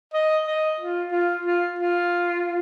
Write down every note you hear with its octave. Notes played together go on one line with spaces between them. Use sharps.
D#5
D#5
F4
F4
F4
F4